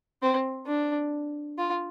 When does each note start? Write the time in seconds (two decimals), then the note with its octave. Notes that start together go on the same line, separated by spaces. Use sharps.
0.22 C4
0.67 D4
1.58 F4